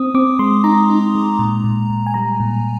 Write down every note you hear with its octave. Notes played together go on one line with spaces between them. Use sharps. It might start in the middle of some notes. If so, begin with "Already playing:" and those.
Already playing: C4 D#6
C4 D6
G#3 C6
D#4 A#5
D#4
G#3
A#2
A#2
A#2
G#5
G3 A#5
A#2